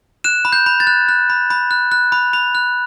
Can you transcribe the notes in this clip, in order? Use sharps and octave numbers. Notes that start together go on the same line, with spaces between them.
F#6 E7
B5
G6
B5
A6
F#6
F#6
B5
B5
F#6
F#6
B5
B5
F#6